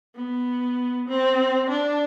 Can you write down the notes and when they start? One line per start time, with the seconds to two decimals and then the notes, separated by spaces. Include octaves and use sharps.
0.16 B3
1.09 C4
1.70 D4